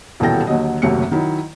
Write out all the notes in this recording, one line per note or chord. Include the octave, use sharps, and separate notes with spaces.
D#1 B2 E3 A4 G5 A#6
D#2 D3 F#3 D#5
F#1 D#2 C3 F#3 A3 C#7
D#3 F#3 E4